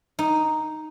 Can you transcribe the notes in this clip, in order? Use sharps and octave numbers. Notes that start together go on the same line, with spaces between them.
D#4